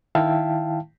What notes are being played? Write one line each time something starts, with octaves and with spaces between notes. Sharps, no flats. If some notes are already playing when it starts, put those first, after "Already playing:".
D#3 E4 E5 F5 G5 A5